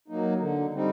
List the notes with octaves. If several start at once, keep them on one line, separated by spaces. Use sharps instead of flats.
F#3 A#3 D#4
D3
G3 C4 D#4